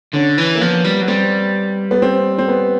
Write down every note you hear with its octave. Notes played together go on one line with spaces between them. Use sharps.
D3 C#4
E3
A#3
F3 B3
G3
F#3
G3 C4
B3
C4
C4
B3